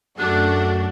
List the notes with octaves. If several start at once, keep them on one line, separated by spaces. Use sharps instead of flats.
F#2 A3 D4 F#4 F#6